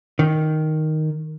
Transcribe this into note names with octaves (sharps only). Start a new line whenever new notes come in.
D#3